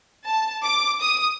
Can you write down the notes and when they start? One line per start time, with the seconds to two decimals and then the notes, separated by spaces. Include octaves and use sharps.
0.25 A5
0.63 D6
1.02 D#6